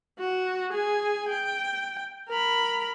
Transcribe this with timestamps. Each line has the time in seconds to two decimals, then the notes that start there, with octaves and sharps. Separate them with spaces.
0.19 F#4
0.72 G#4 G#5
1.29 G5
2.29 A#4 B5